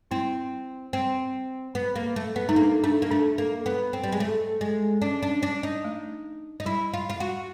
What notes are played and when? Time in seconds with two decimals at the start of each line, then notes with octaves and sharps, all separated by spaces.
0.11 C4 E4
0.93 C4
1.75 B3
1.96 A#3
2.16 A3
2.36 B3
2.49 A3 D#4
2.56 A#3 D4
2.84 A3 D4
3.02 A#3
3.11 A3 D4
3.38 A#3
3.66 B3
3.93 C4
4.04 G3
4.12 G#3
4.20 A3
4.61 G#3
5.02 C#4 D4
5.23 C#4 D4
5.43 D4
5.63 D#4
5.85 A3
6.60 D#4
6.66 G3 E4
6.94 F4
7.10 F4
7.20 F#4